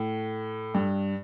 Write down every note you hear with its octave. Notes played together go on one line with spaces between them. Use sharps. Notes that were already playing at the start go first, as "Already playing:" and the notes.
Already playing: A2
G2